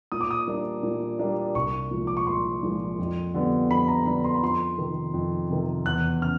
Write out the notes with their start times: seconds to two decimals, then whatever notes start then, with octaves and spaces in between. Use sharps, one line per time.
0.12 A#2 D#6
0.21 D6
0.31 D#6
0.47 G3 A#3 D4
0.83 A#2
1.19 G3 A#3 D4
1.55 C2 C#6
1.91 A#2 F3 G#3
2.07 D6
2.17 C#6
2.27 C2 C6
2.63 A#2 F3 G#3
2.99 F2
3.34 D3 G3 B3
3.70 F2 B5
3.88 A#5
4.06 D3 G3 B3 B5
4.24 C6
4.34 B5
4.42 F2 C6
4.78 C3 D#3
5.14 F2
5.50 C3 D#3
5.86 E2 F#6
6.21 C#3 F6